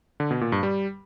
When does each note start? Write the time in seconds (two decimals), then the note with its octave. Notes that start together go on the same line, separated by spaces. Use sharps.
0.20 D3
0.31 B2
0.41 A#2
0.52 G2
0.63 G3